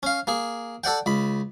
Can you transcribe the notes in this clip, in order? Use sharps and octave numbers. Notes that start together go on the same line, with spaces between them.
C#4 F5
A#3 G#4
A4 D5 F#5 G5
C#2 B5